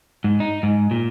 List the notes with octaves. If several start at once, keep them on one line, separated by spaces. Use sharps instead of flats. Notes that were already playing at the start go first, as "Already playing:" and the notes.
G#2
D#4
G#2
A#2